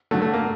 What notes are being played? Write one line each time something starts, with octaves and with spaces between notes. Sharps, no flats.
G2 D3 F#3 A3
A3
A#3